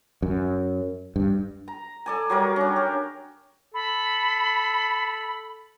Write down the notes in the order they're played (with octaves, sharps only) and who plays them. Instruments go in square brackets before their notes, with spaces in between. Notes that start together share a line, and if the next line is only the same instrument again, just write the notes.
[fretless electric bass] F#2
G2
[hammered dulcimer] A#5
A4 D5 G#5
F#3 G3 A#4
C#4 D4
G4
[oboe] A4 [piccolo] B5